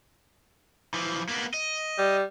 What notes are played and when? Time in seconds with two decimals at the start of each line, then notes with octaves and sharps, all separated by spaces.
0.94 E3 F3
1.29 A#3 B3
1.54 D#5
1.98 G3